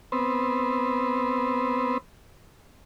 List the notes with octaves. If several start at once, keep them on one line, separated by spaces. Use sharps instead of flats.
B3 C4